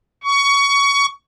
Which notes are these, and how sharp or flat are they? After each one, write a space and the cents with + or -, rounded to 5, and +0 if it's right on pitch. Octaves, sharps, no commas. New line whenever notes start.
C#6 +20